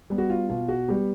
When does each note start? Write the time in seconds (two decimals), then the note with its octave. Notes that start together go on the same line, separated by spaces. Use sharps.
0.10 G3 B3
0.18 F#4
0.30 F4
0.49 B2 F4
0.68 F#4
0.88 G3 B3 G4